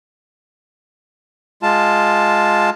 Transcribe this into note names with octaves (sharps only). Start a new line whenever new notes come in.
G#3 F4 A5